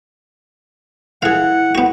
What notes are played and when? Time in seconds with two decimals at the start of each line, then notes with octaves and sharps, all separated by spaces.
1.22 E3 G#4 F5 F#5
1.75 B3 F#4